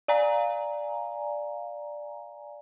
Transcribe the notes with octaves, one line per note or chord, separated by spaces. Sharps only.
D5 F5 G#5 A#5